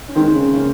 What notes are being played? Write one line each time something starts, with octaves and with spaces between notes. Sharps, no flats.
C#4
D#3 G#3 C4
C#3
A#3 C#4